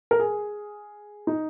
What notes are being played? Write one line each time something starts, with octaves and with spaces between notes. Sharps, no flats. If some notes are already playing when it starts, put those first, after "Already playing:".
A#4
G#4
D#4